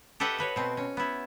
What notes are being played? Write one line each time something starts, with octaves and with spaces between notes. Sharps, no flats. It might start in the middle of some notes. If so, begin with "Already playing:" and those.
G4 A4 B4 D#5 E5 F#5
F#4 B4 C#5
B2 C4
C#4
B3 E4